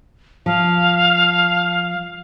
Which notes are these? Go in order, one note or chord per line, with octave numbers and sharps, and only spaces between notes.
F3 F5